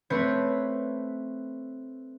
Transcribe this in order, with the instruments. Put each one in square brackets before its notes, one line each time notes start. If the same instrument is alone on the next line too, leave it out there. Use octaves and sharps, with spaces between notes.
[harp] A3 C4 B4 C#5